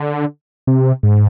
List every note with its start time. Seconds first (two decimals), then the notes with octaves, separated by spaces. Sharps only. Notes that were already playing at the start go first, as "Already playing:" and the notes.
Already playing: D3
0.67 C3
1.03 G#2